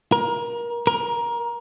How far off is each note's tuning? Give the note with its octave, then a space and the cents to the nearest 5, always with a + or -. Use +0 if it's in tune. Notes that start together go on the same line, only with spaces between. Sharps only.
A#4 +25
A#4 +20